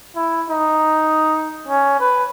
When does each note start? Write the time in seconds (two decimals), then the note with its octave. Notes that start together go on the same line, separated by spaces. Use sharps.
0.16 E4
0.49 D#4
1.67 C#4
2.00 B4